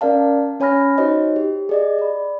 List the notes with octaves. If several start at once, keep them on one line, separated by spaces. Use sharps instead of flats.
C#4 A#4 D5 F5 A5
C#4 C#5 G#5 B5 F6 A#6
D#4 F#4 C5 C#5 D#5
G4
G#4 D5 D#5
D5 B5